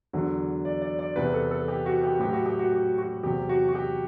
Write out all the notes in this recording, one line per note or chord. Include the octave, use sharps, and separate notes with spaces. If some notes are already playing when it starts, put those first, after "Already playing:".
E2 D3 F#3
D5
D5
D5
E2 C3 E3 B4
A4
A4
G4
F#4
G4
A2 F#3 G4
F#4
G4
F#4
G4
F#4
E2 C3 F#3 G4
F#4
F#4
G4